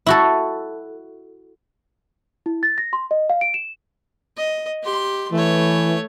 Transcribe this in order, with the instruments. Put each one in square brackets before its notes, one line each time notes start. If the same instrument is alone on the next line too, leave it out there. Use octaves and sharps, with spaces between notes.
[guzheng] E4 F#4 A4
[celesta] E4
A6
A#6
C6
D#5
F5
D7
E7
[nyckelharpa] D#5
G4 C6
[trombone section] E3 [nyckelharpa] A3 C#5